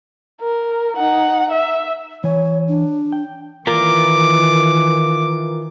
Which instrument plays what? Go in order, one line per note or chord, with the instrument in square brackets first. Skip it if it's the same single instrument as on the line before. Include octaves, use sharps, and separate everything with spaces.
[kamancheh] A#4
D#4 F#5
E5
[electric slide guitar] E3 G#5 [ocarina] C#5
[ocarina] D4
[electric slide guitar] G5
[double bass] D#3 E3 [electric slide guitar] F4 A#4 [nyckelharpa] D6